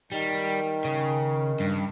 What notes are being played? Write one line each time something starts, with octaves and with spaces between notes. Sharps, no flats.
D#3 G3
C#3
G2